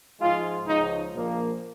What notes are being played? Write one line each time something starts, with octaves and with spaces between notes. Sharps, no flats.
G#2 F3 G#3 F4
C#2 C#3 F3 D#4
A#1 A#2 F3 A#3